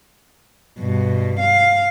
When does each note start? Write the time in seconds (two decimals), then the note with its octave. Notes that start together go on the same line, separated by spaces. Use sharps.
0.79 G2 B2
1.40 F5